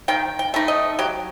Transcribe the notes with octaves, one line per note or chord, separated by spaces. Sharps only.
D#3 G5
G5
A3 D#4
D#5
F#3 G4